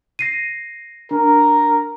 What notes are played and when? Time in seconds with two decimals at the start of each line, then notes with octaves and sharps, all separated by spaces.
0.19 A#6 C7 D#7
1.11 D4 A#4